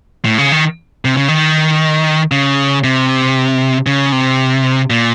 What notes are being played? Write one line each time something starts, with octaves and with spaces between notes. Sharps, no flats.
A2
C#3
D#3
C3
C#3
D#3
C#3
C3
C#3
C3
A#2